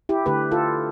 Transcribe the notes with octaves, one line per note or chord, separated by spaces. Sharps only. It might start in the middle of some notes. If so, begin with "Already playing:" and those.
E4 G4
D3 A3 G4 B4
F4 A4